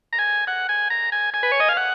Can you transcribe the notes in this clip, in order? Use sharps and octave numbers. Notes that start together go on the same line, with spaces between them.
A#5
G#5
F#5
G#5
A#5
G#5
G#5
B4
C#5
D#5
F5
F#5